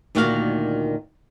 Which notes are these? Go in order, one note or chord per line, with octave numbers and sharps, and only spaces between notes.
D2 A#2 D#3 F#4 D5 F5